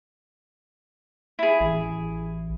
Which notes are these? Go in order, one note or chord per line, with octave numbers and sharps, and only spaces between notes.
E4 G#4
A1